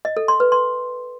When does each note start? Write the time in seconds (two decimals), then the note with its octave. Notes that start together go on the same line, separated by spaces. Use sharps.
0.05 D#5
0.17 A4
0.28 C6
0.40 B4
0.52 C6